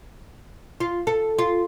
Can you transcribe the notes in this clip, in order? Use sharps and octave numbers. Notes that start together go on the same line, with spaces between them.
F4
A4
F4